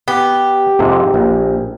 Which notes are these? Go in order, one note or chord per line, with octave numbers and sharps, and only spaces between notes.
B3 G4
F2 G#2 C3
A#1